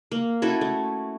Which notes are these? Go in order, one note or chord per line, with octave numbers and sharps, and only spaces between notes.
A#3
C#4 E4 F#4 A4
A3